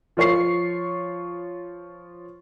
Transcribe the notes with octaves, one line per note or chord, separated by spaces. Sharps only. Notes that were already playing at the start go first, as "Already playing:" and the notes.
F3 F4 C#5 C#6 C7